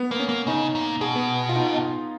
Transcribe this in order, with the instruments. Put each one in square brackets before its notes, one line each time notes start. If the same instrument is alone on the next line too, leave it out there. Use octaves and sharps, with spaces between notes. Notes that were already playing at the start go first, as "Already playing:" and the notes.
Already playing: [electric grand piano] B3
[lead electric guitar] A#3 [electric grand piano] B3
[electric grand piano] C#4
[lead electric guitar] A#3
[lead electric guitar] C#3 [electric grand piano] D#4
[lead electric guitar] A#2
[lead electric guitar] B2 [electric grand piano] G#4
[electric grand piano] B3
F4
D#4